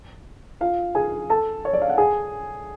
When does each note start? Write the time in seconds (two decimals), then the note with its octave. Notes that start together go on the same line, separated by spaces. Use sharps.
0.61 F4 F5
0.95 G#4 G#5
1.30 A4 A5
1.65 C#5
1.73 D5
1.82 F5
1.89 F#5
1.98 G#4 G#5